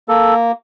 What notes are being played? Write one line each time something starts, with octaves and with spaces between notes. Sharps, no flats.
A#3 A4